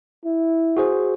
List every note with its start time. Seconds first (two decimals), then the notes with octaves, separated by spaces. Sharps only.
0.24 E4
0.77 F#4 G#4 C5